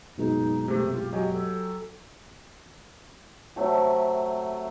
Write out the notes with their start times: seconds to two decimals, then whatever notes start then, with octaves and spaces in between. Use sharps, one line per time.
0.18 F#1 B2 G#3 D#4
0.68 C3 A3 G4
0.95 F4
1.12 F#3 G4 D#5 G#5
1.33 A4
3.56 C3 F#3 A3